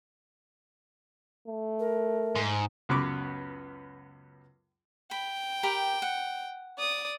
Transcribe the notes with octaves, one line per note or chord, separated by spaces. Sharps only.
A3
A#4
G#2
C#2 F#2 B3 B4 C#6 D6
G5 B5
G4 A#4 B5
F#5
D5 D#6